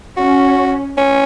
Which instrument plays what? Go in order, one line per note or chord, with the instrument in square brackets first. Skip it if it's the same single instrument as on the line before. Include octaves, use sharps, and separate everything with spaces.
[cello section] C#4 [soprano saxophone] F#4
[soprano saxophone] C#4